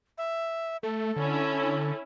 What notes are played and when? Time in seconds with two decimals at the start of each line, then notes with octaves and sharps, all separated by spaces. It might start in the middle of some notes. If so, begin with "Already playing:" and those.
0.18 E5
0.83 A3 A4
1.16 D3 C#4 E4